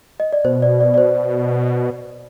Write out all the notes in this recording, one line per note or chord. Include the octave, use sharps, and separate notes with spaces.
D#5
D5
B2 C5
D5
D5
D5
C5